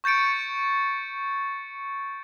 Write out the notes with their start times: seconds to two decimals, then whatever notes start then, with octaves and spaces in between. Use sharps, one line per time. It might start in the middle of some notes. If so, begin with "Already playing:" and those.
0.04 C#6 G6 A6 C#7 D7